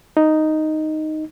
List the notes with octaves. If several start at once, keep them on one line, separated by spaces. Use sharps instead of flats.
D#4